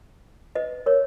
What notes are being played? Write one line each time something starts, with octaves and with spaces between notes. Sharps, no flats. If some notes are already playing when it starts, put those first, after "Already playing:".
B4 D#5
A#4 C#5